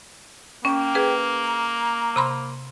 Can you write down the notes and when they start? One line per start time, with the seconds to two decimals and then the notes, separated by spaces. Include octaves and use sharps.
0.65 A#3 C#4 G5
0.95 G#4 B4
1.45 A#5
2.16 C3 B5 C6